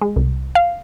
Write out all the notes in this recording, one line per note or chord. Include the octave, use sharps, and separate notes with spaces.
G#3
C2
F5